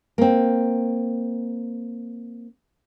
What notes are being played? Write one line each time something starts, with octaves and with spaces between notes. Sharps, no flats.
A#3 C4